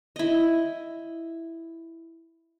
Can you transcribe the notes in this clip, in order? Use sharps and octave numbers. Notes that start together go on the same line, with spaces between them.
E4 D#5